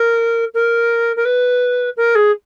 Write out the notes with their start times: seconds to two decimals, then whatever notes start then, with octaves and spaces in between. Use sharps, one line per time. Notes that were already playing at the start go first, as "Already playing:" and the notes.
Already playing: A#4
0.54 A#4
1.16 A#4
1.25 B4
1.97 A#4
2.15 G#4